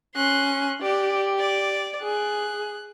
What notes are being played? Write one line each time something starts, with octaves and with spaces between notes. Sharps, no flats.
C#4 C6 F#6
G4 D5
D5
G#4 F#6